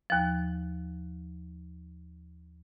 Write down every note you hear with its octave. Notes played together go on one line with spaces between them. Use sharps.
D#2 F3